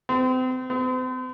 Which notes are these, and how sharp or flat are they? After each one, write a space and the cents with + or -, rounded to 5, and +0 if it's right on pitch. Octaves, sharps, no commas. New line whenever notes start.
C4 -35
C4 -45